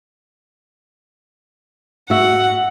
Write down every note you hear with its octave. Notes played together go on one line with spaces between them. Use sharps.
F#4 E5 F#5